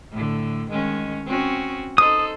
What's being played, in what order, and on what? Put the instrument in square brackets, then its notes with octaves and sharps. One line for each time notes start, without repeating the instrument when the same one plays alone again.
[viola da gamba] A2 D3
D#3 G#3 C#4
C4 C#4 F#4
[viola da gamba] D#4 A4 C5 [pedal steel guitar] D#6